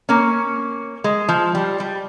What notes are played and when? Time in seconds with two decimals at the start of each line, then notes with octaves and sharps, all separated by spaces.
0.09 A#3 C#4
1.04 G#3
1.29 F3
1.55 G3
1.80 G3